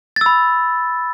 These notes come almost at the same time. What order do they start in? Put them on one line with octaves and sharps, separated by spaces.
A6 E6 B5